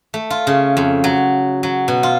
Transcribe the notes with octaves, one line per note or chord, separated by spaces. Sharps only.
A3
F4
C#3
F2
F#3
F#3
B2
F4